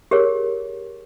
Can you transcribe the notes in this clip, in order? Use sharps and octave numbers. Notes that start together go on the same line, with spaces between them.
G4 G#4 A#4 C#5